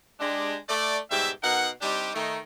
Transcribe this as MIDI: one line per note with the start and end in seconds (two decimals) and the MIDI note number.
0.20 0.57 56
0.20 0.57 62
0.20 0.57 67
0.69 0.98 57
0.69 0.98 74
1.11 1.31 44
1.11 1.31 47
1.11 1.31 55
1.11 1.31 67
1.11 1.31 76
1.43 1.69 47
1.43 1.69 63
1.43 1.69 70
1.43 1.69 78
1.81 2.11 55
1.81 2.11 60
1.81 2.11 62
1.81 2.11 63
1.81 2.11 67
2.14 2.38 51
2.14 2.38 57
2.14 2.38 63